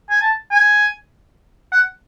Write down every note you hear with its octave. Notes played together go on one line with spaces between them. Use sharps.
G#5
A5
G#5
F#5